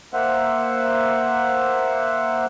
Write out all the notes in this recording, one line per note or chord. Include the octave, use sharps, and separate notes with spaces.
A#3 C5 E5 F#5